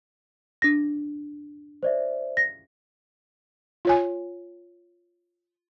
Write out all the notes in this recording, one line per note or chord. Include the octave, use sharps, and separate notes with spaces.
D4 A#6
C5 D5 E5
A#6
F4 C#5 G#5